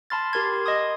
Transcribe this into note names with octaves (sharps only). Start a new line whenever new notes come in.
A5 B5 C6 F6 A6
G4 A#4 C6 G#6
D#5 C6 D#6